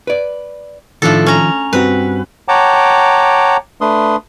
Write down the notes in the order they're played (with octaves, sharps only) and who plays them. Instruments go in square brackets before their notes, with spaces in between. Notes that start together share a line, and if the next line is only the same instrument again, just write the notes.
[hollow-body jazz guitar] B4 D5
[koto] A2 D4 A4 [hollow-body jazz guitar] D#3 F3 F4
[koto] C#4 A#5
[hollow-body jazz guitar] G2 C4 F#4 [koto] B4
[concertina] C#5 F#5 G5 A5 A#5 D6
A3 D4 B4 C6 D#6